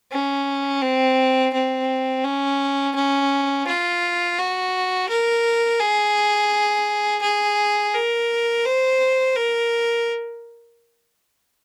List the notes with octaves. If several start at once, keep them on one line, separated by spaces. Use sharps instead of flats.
C#4
C4
C4
C#4
C#4
F4
F#4
A#4
G#4
G#4
A#4
C5
A#4